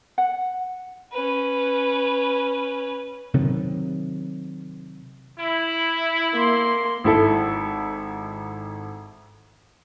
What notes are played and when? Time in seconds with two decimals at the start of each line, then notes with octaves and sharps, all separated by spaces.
0.18 F#5
1.12 C#4 B4
3.34 C3 D#3 F#3
5.38 E4
6.34 A#3 C6
7.04 G#1 E4 A4